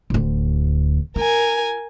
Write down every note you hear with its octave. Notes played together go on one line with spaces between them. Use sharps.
D1 D2
F4 A#4 G#5